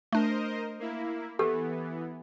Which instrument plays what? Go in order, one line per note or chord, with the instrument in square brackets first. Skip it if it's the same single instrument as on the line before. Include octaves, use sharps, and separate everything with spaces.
[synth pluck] A3 D4 [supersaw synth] A#4 C5 D#5
[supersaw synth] A#3 E4
[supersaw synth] E3 B3 [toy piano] G4 A4